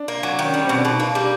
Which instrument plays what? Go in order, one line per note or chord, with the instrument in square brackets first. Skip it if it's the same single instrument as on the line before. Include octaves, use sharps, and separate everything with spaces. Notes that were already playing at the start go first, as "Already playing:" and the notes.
Already playing: [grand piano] D4
[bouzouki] A#3
F#3
D#3
[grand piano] C#4
[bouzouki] G3 [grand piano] D4
[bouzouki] B2 [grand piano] C4
[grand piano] D4
[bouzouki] B2 [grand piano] D#4
[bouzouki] A#3 [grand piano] D4
[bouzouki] G3